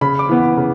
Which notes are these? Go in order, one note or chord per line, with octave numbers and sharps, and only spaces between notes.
C#3 B5
D6
E3 B3
C#3